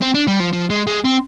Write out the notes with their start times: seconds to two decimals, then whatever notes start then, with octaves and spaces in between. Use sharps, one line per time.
0.02 C4
0.14 D4
0.27 G3
0.40 F3
0.53 F3
0.70 G#3
0.87 G#3
1.04 C4